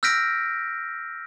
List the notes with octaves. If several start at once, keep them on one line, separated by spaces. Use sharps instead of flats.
E6 F6 G6 A#6 B6 D7